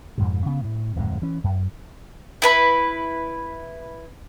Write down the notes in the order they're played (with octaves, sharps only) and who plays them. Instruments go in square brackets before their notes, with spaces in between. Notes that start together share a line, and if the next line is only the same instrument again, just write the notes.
[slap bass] F2 G#2 B2
C#3 B3
A2
D1 F2 G#2 G#3
E3 C#4
F#2
[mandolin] E4 B4 B5